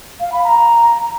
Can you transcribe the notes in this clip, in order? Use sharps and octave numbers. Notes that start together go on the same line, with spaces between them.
F5
B5
A#5